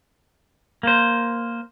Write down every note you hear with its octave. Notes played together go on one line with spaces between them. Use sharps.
A#3 C5